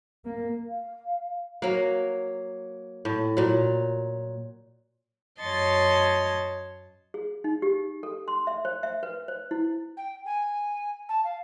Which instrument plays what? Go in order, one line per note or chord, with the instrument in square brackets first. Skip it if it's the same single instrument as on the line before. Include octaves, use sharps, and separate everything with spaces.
[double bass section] A#3
[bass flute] F5
[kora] F#3 A#3
A2
A#2 F#3
[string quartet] F#2 C#5 D#5 A5 C6 A6
[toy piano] G#4
D#4
G4
A4
C6
E5
C5
E5
B4
C5
E4
[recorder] G5
G#5
A5
F5